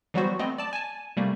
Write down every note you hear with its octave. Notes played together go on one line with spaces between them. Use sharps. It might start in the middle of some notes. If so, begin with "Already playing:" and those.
E3 F#3 G3 B3 F#4 C5
A3 B3 C4 D#5
D5 A5
G#5 A5
C3 G3 A3 A#3